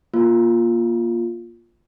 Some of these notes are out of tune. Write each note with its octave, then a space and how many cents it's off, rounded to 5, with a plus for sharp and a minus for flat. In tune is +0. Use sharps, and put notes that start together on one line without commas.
A#3 +20 F4 +0